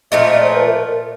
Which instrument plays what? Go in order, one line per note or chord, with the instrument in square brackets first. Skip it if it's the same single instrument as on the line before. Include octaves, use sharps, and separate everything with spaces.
[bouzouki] A#2 F3 A3 [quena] D#5
[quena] E5
D#5
D5
C5
B4
A#4